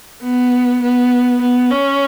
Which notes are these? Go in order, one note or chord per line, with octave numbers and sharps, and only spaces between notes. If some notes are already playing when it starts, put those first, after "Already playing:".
B3
B3
B3
C#4